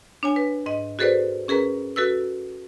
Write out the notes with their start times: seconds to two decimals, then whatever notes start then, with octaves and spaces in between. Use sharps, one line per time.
0.23 D4 C#5 G#5
0.36 B4
0.66 G#2 D#5
0.99 F#4 G#4 A4 B4 C5 D5
1.48 C#4 G#4 A#4 B4 A#5
1.96 F#4 A4 B4 E6